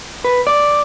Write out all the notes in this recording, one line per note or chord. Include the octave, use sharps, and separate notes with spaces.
B4
D5